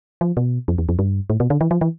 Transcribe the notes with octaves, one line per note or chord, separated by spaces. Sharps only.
F3
B2
F2
E2
F2
G2
A2
B2
D3
E3
F3
E3